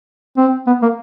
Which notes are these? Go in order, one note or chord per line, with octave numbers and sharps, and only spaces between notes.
C4
B3
A#3